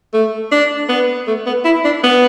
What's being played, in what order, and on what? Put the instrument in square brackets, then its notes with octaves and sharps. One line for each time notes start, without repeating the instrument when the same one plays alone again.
[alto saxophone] A3
D4
B3
A3
B3
E4
D4
B3